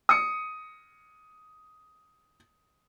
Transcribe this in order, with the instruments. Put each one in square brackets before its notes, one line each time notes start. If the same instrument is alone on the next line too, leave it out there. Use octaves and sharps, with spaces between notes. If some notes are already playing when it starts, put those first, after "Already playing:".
[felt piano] D#6 C#7